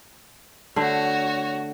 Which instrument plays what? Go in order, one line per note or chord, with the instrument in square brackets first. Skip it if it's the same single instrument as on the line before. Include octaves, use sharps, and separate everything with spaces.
[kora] D3 A3 [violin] F#4 C#5